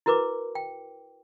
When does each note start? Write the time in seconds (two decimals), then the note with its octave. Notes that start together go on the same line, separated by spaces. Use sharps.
0.06 E4 F#4 A#4 B4 D6
0.55 G5